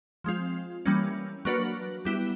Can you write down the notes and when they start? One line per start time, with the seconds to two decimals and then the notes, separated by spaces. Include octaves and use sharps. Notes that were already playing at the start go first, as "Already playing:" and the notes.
0.24 F3 G#3 C4 F4
0.85 E3 G3 A#3 C#4
1.45 F#3 A#3 D4 F#4 B4
2.05 G3 B3 E4 G4